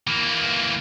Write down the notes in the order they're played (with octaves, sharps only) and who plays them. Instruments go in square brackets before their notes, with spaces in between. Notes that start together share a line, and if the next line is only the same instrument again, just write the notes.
[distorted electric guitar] E3 A#3